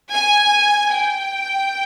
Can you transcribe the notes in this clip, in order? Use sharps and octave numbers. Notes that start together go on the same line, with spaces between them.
G#5
G5